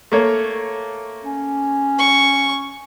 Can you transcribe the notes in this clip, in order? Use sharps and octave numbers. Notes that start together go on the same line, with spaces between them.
A3 A#3 C#5
C#4
C#6